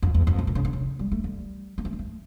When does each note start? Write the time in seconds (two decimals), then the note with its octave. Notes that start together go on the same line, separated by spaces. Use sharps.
0.02 F2
0.14 E2
0.27 F2
0.39 A2
0.47 A#2
0.55 C#3
0.65 D3
0.73 C#3
0.99 G3
1.12 A3
1.24 G3
1.78 A#3
1.85 A3
1.93 G3
1.99 A3